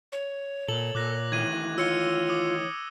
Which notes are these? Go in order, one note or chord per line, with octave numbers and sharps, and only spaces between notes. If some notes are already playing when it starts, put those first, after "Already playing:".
C#5
A#2 A4 F#7
A#2 D6 F#6 A#6
D#3 E3 A3 G#6 D#7
F4 C#5 E6 C#7 G7
D6 D#6 D#7